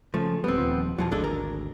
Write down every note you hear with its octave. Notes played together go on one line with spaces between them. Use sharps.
C#3 F3 A3
D1 G3 B3 C4
D#1 D#2 F3
E2 B2 F3 F#3
G#1 D2 G#3 D4 A4
A#4